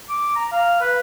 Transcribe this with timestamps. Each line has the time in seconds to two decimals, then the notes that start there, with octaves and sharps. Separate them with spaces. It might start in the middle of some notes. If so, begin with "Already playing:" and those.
0.09 D6
0.35 A#5
0.52 F5
0.81 B4